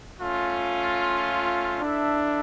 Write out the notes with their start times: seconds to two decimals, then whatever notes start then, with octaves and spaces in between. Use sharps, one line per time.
0.21 A3 C#4 F4
1.80 D4 E4 A4 E5